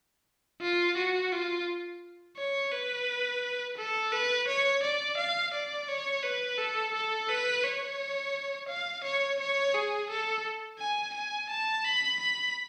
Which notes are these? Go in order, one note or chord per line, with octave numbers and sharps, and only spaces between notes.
F4
F#4
F4
C#5
B4
A4
B4
C#5
D5
F5
D5
C#5
B4
A4
A4
B4
C#5
F5
C#5
C#5
G#4
A4
G#5
G#5
A5
B5
B5